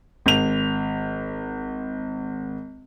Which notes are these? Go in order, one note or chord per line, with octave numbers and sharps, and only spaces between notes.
G#1 F7